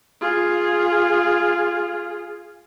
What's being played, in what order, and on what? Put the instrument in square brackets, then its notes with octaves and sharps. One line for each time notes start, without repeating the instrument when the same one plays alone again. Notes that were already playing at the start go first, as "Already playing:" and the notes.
[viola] F4 G#4